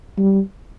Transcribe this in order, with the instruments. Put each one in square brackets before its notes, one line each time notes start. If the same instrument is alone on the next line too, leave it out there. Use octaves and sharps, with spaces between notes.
[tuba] G3